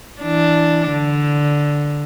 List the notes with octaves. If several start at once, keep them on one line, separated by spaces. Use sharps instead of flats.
E3 D4
D3